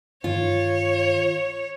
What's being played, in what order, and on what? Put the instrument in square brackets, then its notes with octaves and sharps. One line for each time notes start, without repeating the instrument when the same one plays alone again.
[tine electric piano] G2 D#3 [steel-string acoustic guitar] F4 [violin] C#5